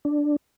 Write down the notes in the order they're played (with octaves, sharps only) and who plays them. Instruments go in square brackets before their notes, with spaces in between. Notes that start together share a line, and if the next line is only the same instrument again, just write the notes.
[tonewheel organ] D4